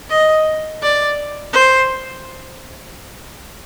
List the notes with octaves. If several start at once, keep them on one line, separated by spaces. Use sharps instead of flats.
D#5
D5
C5